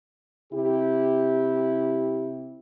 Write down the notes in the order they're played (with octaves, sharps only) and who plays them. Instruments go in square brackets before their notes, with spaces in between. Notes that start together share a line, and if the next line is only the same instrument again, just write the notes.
[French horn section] C3 E4 G4